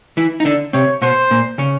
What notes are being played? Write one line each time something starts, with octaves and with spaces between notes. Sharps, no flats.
E3 E4
D#4
D3 D4
C3 C4 C#5
B2 B3 C5
A#2 A#3
C#3 C#4